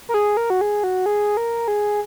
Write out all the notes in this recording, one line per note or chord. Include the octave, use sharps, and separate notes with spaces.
A#4
G#4
A#4
F#4
G#4
F#4
G#4
A#4
G#4